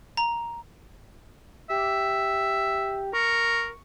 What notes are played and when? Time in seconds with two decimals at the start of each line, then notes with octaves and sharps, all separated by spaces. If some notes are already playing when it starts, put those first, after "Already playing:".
0.17 A#5
1.70 G4 E5
3.13 A#4 C#6